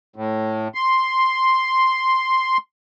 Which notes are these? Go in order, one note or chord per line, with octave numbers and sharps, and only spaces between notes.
A2
C6